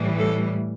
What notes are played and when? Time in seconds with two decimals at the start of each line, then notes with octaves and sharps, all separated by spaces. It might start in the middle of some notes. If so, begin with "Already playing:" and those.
Already playing: A2 E3 G3
0.18 A4